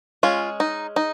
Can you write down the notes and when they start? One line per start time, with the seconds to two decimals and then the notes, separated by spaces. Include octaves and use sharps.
0.23 G#3 C#4 F4
0.60 D#4
0.96 D#4